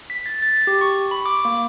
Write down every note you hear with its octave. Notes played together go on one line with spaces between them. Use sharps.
B6
A6
A6
G4
C#6
B5
D6
A#3